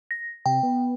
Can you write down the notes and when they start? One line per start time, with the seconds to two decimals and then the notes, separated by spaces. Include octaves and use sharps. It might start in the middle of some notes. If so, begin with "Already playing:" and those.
0.11 A#6
0.46 C3 G5
0.63 B3